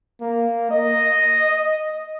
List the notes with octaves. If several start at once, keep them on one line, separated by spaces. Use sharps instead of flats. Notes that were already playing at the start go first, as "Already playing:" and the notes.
A#3
D#5